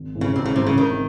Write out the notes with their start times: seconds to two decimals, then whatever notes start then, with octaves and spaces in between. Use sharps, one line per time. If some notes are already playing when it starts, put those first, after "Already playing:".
Already playing: G#1
0.15 G#2 E3 C4
0.21 C#3
0.35 G#1 C3
0.45 C#3
0.56 G#2 C3 E3 C4
0.66 C#3
0.76 G#1 D#3